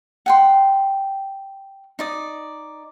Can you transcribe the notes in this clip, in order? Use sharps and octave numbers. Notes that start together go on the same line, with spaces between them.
F#5 G5 C6
D#4 D5 D#6